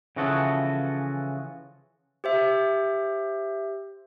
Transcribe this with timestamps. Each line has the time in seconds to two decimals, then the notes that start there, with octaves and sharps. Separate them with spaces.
0.16 C#3 E3 F3 F#4 G#4 A4
2.24 G4 C5 E5